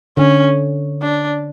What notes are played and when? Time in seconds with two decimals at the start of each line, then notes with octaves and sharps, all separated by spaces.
0.17 D3 C#4
1.02 D4